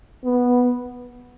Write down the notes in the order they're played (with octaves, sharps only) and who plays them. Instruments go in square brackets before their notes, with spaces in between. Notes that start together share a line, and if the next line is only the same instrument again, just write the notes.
[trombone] B3